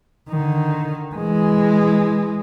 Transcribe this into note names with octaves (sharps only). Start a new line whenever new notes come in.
D3 D#3
E3 G#3